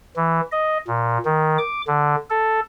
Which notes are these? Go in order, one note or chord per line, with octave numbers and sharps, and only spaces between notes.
E3
D#5
A#2
D#3
D6
D3
A4